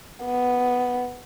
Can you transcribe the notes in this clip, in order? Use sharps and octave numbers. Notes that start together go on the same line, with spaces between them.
B3